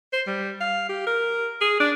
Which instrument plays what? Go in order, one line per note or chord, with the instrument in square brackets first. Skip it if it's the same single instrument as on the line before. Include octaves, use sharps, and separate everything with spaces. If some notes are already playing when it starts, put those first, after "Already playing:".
[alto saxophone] C5
G3
F5
G4
A#4
G#4
D4